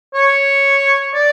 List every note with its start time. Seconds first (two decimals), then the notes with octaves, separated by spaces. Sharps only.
0.14 C#5
1.14 D5